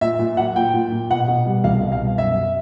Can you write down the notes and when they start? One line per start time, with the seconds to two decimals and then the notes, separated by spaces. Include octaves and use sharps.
0.01 A#2 E5
0.19 A#2
0.37 F#3 F#5
0.56 A#2 G5
0.74 A#2
0.92 A#2
1.10 B2 F#5
1.28 B2
1.46 G3
1.64 C2 F5
1.82 B2
1.92 F5
2.01 G3
2.18 F#2 E5